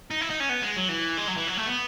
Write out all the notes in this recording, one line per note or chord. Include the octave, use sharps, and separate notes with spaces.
D#4
E4
D#4
C#4
B3
G#3
F#3
E3
G#3
F#3
E3
F#3
A3
B3